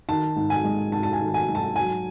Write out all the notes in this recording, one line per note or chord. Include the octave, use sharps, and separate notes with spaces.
D#3 A5
G#2
G#5
G#3
G#2 A5
A5
G#5
D#3
G#5
G#2
A5
F#3 G#5